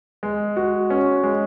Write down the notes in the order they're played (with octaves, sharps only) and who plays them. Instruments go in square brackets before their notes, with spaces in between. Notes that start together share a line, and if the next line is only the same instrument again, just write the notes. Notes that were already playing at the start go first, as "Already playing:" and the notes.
[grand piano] G#3
F#4
C#4
G#3